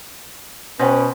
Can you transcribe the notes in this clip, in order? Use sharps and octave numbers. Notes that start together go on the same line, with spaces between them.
B2 C#4 B4 C5 G5